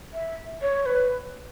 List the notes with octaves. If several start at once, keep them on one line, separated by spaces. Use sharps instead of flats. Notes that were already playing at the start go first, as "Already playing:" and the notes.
E5
C#5
B4